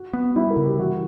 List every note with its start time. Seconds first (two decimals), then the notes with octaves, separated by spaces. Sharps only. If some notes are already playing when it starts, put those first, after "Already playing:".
Already playing: F#4
0.13 B3
0.36 G3 E4
0.50 A#4
0.57 C#3
0.64 G4
0.78 E3 F#4